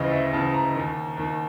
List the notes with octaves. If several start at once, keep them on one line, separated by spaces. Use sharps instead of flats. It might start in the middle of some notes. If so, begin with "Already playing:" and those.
Already playing: D2 C#3 E3 D#5
E5
D2 C#3 E3 A5
A#5
D#2 D#3
D#2 D#3